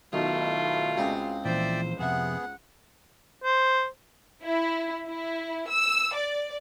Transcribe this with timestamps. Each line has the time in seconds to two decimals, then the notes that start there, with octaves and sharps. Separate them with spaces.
0.13 B1 B2 D#3 A3 E4 F4
0.97 C#2 C4 F#4 G#4
1.45 A#2 E3 F3 C5 D5 E5 G5
1.99 F2 C3 B3 G#4 E5 F#5
3.44 C5
4.45 E4
5.08 E4
5.70 E6
6.16 D5